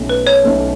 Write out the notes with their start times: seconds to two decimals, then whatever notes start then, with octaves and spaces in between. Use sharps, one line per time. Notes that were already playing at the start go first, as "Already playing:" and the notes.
Already playing: B1 B2 A3 C#4
0.09 B4
0.27 C#5
0.43 B1 B2 A3 C#4